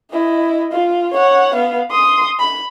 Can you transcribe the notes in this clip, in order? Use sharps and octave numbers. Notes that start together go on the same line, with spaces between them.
E4 D#5
F4
C#5 F#5
B3 F5
C6 D#6
B5